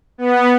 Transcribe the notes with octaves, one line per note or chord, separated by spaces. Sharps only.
B3